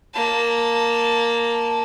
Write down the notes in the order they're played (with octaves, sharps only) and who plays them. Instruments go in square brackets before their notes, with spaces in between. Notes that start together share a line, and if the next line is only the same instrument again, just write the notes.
[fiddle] A#3 A5